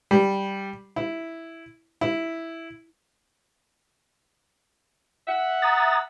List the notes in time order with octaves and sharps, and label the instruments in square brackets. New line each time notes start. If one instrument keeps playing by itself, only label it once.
[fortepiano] G3
E4
E4
[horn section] E5 F#5
[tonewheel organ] A#5 D#6 A6